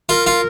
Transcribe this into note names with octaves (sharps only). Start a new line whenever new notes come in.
F4 A#4
F4